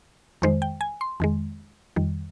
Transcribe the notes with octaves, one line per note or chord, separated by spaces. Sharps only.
F2 D#3 G#3 C5
G5
G#5
C6
F2 D#3 G#3
F2 D#3 G3